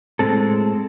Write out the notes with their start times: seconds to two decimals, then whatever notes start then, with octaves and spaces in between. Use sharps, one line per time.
0.19 A2 G#3 C4 A4